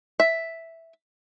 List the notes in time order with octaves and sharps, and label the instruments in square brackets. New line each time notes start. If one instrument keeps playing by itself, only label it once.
[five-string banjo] E5